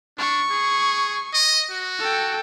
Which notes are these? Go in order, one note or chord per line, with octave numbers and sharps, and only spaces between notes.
D4 C#6
G#4
D#5
F#4
A4 G5